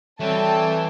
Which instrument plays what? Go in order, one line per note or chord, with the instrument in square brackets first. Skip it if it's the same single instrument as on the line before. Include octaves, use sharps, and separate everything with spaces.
[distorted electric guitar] E3 [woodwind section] F#3 G3 C4 [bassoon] A3 [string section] G5 A5